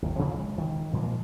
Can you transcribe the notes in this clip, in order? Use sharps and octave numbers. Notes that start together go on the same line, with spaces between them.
G1 D#2
C3 F3 A#3 C4
G#3
D#3
A#2 F3 G#3 A#3